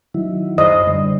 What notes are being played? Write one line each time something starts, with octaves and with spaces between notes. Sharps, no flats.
D#3 F#3 E4
F#2 C5 D#5
D3 G3